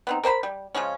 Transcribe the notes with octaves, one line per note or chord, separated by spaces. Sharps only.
B3 C4 D#4
A#4 C5 G5 B5
G3
C#3 F3 G#3 C#4